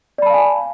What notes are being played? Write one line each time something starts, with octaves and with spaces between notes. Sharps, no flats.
D5 F5 G#5 A5 B5